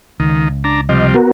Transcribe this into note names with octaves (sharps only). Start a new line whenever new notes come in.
C#2 D#3
D4 A#5
C3 F3 G3 D#5
B3 F#4 A#4